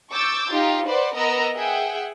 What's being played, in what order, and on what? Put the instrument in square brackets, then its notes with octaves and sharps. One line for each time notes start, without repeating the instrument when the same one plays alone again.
[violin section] C#6 D6 E6 G6 A6
D#4 F4 G4
B4 C5 D5 F#5
B3 A#4 D#5 A#5 E6
G#4 E5 F#5 G5